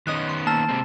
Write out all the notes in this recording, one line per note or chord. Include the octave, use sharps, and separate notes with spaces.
D#3 B3 C#4 D#5 D#6 F#6
C6
A#3 A5 E6
C3 G#3 C4